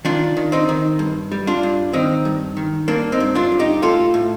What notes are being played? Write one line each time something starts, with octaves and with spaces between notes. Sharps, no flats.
D#3 D4 F4
D#3
C4 D#4
D#3
G2
G3
D4 F4
G2
D#3 C4 D#4
G2
D#3
G2 A#3 D4
C4 D#4
G2
D4 F4
G2
D#4 G4
A2 F4 A4
A2